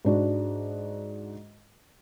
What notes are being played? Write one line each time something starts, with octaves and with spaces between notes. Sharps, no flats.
G#2 D4 F#4